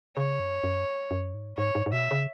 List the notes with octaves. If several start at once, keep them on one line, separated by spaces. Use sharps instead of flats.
C#3 C#5
F#2
F#2
F#2
G#2
G#2 C#5
G#2
G#2
B2 E5
C#3